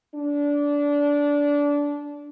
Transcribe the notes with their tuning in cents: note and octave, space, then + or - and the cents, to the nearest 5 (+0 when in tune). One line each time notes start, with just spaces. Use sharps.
D4 -20